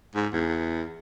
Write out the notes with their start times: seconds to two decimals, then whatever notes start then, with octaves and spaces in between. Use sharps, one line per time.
0.15 G#2
0.33 E2